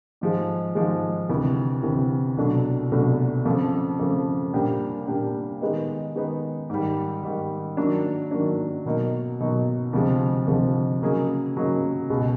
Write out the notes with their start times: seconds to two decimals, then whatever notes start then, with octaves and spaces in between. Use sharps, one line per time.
0.21 G#2 F3 G#3
0.75 G#2 F3 G#3
1.29 D2 C3 E3
1.83 D2 C3 E3
2.37 C2 B2 F#3 A3 D4
2.92 C2 B2 F#3 A3 D4
3.45 F2 C#3 F3 A3
3.99 F2 C#3 F3 A3
4.53 A#2 G3 A#3 D4 G4
5.07 A#2 G3 A#3 D4 G4
5.61 D#3 G#3 B3 D#4
6.16 D#3 G#3 B3 D#4
6.69 G#2 D#3 G3
7.23 G#2 D#3 G3
7.77 D#3 F#3 A#3 D4
8.31 D#3 F#3 A#3 D4
8.85 B2 F#3 A#3 D#4
9.40 B2 F#3 A#3 D#4
9.93 D2 C3 F3 G#3
10.47 D2 C3 F3 G#3
11.01 C#3 F#3 A#3 D#4 G#4
11.56 C#3 F#3 A#3 D#4 G#4
12.09 C#2 B2 G#3